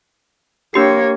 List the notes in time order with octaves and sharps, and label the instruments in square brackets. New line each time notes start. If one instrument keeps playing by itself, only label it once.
[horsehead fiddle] A#3 C#5 [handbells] D4 G4 C7